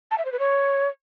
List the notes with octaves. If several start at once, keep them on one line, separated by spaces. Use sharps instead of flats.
A5
E5
C5
B4
C#5